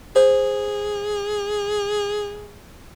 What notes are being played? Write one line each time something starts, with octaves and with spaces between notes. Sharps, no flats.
G#4 C5